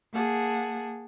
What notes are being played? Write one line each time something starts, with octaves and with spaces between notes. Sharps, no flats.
A#3 G#4 F#5 A5